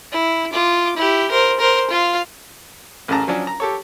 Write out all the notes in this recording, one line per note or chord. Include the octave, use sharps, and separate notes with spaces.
E4
F4 D6
E4 G4
A#4 C5
A#4 C5
F4 F5
A1 F#2 G#4 A5 A#5
F3 F#3 C#4 D4
A#5
G4 A4 C#5